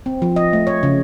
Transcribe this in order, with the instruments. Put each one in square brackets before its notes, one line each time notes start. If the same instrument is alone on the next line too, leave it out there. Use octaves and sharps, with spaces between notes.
[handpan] C4
F3
D#5
A3
C#5
C#3